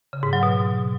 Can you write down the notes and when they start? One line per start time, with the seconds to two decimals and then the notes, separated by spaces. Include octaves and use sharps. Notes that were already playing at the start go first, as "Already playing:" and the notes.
0.13 C#3
0.23 G#2
0.33 F#3
0.43 B2